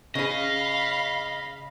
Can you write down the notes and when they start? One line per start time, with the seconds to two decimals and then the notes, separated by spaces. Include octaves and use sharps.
0.15 C#3 C#4 D#5 F5 B5